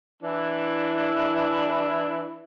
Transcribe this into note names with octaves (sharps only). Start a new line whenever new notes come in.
E3 D4 E4